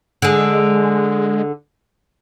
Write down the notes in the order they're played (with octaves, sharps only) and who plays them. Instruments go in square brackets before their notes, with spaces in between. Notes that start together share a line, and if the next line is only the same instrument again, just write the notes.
[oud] D3 G#4 [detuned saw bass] G#3